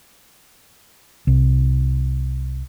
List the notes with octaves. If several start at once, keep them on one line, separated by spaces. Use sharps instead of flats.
C2